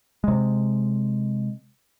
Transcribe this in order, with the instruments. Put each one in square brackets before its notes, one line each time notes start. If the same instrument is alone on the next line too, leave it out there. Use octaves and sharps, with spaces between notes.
[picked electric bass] C3 G#3